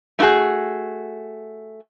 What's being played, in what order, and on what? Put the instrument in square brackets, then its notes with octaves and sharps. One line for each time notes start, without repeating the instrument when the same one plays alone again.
[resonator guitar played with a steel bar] A3 D#4 E4 F#4 G#4